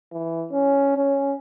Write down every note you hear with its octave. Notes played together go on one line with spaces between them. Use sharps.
E3
C#4
C#4